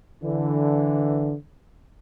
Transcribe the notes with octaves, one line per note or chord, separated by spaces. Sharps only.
D3 E3